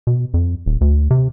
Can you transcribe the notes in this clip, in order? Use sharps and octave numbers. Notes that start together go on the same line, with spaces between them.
B2
F2
D#1
D2
C3